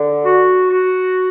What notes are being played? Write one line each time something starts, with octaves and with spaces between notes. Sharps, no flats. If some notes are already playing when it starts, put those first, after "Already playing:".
Already playing: D3
F#4
F#4